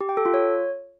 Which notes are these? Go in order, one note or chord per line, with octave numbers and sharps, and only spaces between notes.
G4
G5
A4
F4
C#5